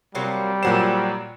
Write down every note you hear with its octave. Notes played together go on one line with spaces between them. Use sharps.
C3 F#3 G3 A#3
A#2 F#3 C5 F#5 E7